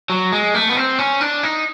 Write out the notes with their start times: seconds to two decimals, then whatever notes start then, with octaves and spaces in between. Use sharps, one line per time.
0.10 F#3
0.32 G#3
0.54 A3
0.69 B3
0.77 C4
0.99 C#4
1.21 D4
1.43 D#4